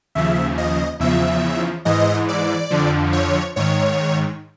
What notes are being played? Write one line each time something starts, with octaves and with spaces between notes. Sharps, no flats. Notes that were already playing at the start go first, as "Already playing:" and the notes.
D#2 C#3 F3 E5
D#5
E2 C#3 F3 E5
G#2 E3 D#5
D5
F2 D3 F3
C#5
G#2 D#3 C#5